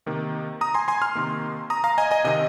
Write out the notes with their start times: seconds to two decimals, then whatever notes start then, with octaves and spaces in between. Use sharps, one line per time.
0.06 C3 D#3 A#3
0.61 A#5 D#6
0.74 G#5 C6
0.88 G#5 C6
1.02 C6 F6
1.15 C3 D#3 A#3
1.70 A#5 D#6
1.84 F5 A#5
1.98 D#5 G#5
2.11 D#5 G#5
2.24 C3 D#3 C4 D#5